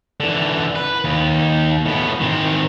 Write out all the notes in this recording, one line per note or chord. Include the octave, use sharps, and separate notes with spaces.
D3 E3
B4
D#2
A2 B3
D#3 C4